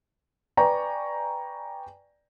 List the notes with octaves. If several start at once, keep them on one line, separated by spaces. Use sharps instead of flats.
B4 D5 G5 G#5 A#5 C#6